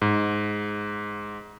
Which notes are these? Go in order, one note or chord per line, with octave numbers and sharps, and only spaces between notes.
G#2